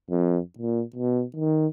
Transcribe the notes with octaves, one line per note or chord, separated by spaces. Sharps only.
F2
A#2
B2
D#3